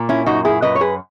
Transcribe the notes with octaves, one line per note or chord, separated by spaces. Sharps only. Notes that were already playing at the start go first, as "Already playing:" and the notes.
Already playing: A#2
C#4 E4
F#2 D#4 F#4
E4 G#4
F#2 B4 D#5
C#5
G#4 B4